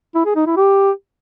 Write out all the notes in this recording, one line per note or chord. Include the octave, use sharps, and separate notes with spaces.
E4
G#4
D#4
E4
G4